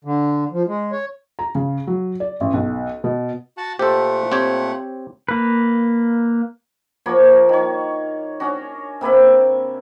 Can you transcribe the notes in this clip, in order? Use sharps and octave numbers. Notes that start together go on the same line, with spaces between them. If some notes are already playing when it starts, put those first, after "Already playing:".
D3
F3
G#3
C#5
A#5
C#3
F#3
D5
A1
B1
B2
F#4 F#5 A5
A#2 A3 G4 A4 C5 F#5 C6
C4 G4 C#5
A#3 B4
F3 A#3 F#4 C#5
D#3 C#5
C#4 D4 F#4
C3 A#3 B4 E5